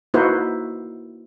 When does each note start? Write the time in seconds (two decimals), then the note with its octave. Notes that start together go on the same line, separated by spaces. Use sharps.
0.14 A#3 D#4 E4 F#4 B4 C5